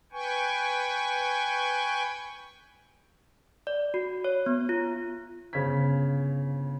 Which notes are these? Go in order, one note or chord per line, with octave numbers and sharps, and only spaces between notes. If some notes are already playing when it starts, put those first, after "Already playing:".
B4 G5 G#5 C#6
D5
F#4
C#5
B3
F4
G1 C#3 C5 G#6 B6